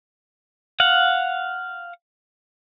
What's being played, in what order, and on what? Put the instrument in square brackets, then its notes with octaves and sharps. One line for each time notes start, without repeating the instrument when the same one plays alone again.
[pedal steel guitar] F5 F#5